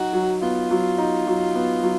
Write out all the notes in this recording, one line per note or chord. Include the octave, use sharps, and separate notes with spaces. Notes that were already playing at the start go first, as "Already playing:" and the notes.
Already playing: F#3 D#4 F#4
F#3
B3 F4
F#3
D#4
F#3
B3
F#3